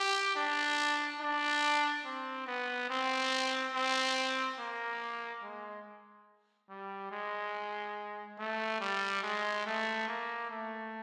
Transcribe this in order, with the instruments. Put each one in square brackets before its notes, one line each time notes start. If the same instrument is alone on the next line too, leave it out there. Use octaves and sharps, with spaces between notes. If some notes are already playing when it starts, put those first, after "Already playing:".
Already playing: [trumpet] G4
D4
D4
C4
B3
C4
C4
A#3
G#3
G3
G#3
A3
G3
G#3
A3
A#3
A3